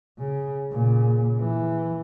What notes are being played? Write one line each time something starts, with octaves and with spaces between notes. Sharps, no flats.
C#3
A#2 C#3
E3